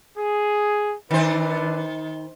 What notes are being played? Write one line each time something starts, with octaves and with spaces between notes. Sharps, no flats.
G#4
D#3 D4 E4 B4 C5